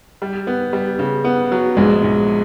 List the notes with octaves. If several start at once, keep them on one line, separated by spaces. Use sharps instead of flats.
G3
B3
G3
C#3
B3
F#3
A#1 G#3
A#1